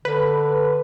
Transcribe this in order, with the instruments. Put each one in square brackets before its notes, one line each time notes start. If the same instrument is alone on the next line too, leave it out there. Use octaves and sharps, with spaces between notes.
[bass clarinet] D3 [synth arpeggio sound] B4